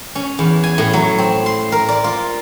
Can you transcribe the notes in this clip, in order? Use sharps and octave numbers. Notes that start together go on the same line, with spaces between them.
C#4
E2
G#5
A2
F#3
C4
C6
A#4
D5
F4